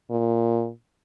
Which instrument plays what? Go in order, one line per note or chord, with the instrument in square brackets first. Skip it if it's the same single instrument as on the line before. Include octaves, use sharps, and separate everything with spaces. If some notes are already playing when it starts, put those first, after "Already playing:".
[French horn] A#2